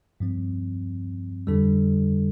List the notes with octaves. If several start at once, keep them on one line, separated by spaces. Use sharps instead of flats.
G2 F3 C4
F2 D3 G3 D4 A4